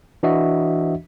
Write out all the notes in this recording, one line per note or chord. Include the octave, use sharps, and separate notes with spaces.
E3 D4 F#4 D#5 E5